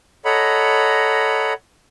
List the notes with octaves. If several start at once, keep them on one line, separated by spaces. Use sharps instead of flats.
A4 C#5 D#5 F#5 A#5 B5